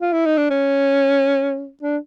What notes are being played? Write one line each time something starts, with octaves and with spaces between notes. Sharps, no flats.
F4
E4
D#4
D4
C#4
D4